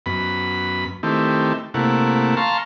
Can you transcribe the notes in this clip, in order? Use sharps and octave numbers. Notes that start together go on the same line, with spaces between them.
F#2 B3 B5
D#3 A3 C4 E4 G4
C3 A3 A#3 E4 F#5
F5 A5 A#5 C6 C#6